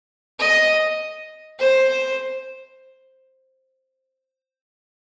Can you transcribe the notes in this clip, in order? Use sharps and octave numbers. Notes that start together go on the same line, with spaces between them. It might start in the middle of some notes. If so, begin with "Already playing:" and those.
D#5
C5